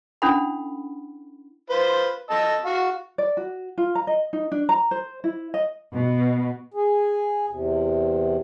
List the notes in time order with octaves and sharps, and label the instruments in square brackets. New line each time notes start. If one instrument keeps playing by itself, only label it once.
[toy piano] C#4 D4 E4 A4 F#5 B5
[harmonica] F4 B4 C5
D#5 A5 E6
F#4 F5
[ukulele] D5
F#4
F4
A#5
D#5
D#4
D4
A#5
C5
E4
D#5
[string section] B2
[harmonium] G#4
E2 C3